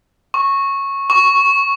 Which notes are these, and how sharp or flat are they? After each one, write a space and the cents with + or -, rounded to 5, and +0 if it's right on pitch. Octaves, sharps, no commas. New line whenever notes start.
C#6 -10
C#6 +5